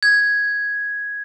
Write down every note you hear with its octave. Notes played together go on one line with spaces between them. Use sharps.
G#6